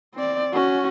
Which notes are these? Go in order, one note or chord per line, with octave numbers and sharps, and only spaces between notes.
C4 D5
C#4 F#4